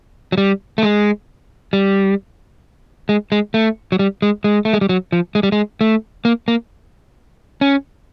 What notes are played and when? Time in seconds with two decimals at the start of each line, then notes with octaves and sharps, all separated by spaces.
0.32 F#3
0.38 G3
0.78 A3
0.83 G#3
1.73 G3
3.09 G#3
3.32 G#3
3.54 A3
3.92 F#3
3.99 G3
4.22 G#3
4.44 G#3
4.65 A3
4.73 G#3
4.81 G3
4.89 F#3
5.12 F3
5.35 G#3
5.43 G3
5.52 G#3
5.81 A3
6.25 A#3
6.48 A#3
7.61 C#4